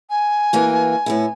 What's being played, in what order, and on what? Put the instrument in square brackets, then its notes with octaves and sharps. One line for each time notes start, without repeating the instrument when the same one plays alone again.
[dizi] G#5
[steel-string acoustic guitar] E3 A#3 F#4
A2 B3 E4